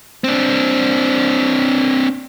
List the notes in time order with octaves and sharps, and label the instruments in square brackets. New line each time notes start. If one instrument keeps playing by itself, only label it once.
[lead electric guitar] C4 D4